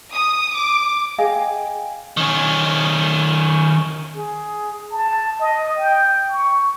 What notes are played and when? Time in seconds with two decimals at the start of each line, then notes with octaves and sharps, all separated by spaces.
0.13 D#6
0.53 D6
1.18 G#4 D#5 F5 G5 G#5
2.17 D#3 C#4
4.16 G#4
4.91 A5
5.40 D#5
5.78 G5
6.29 C#6